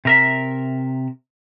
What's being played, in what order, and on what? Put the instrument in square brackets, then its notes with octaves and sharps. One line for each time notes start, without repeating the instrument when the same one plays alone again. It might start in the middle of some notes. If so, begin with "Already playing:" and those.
[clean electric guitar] C3 A#4 E5